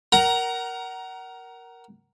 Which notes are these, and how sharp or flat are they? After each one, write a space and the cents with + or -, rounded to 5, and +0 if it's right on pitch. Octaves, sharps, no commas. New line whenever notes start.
A#4 +5 F#5 +30 A#5 +15